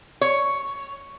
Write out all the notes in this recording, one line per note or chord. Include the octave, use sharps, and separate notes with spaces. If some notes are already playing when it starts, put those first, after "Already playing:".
C#5